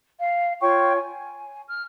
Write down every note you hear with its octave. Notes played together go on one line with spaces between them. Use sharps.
F5
F4 C#5 G5 C#6
G#5
F6